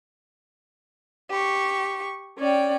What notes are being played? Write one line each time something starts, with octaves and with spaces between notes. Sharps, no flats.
G4 C#6
C#4 D5 G5